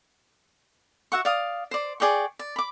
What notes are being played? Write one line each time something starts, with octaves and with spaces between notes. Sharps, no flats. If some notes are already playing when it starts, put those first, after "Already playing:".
F#4 E5 F#5 C#6
D5 F5 D#6
C5 D5
G#4 D5 G5 C#6
D5
B5 D6